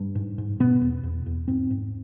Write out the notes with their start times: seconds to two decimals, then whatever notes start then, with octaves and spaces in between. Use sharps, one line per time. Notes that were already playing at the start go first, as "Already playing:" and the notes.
Already playing: G2
0.15 G#2
0.38 G#2
0.60 B2 B3
0.82 E2
1.03 E2
1.26 E2
1.48 G#2 C4
1.70 G#2